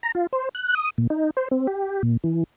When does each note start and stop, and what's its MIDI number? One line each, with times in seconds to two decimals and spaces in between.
0.03 0.12 82
0.15 0.27 65
0.33 0.49 72
0.55 0.74 90
0.75 0.90 87
0.98 1.07 46
1.10 1.30 63
1.37 1.48 72
1.51 1.67 60
1.67 2.02 67
2.03 2.17 46
2.24 2.43 52